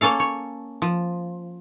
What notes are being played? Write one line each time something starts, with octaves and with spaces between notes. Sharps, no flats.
A#3 C#4 A4 F5
C#5
F3